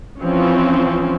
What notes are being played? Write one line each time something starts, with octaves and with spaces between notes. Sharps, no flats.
E3 F3 C4 C#4